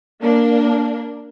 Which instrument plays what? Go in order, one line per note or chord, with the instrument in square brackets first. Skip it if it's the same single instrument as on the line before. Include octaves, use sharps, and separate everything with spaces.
[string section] A#3 D4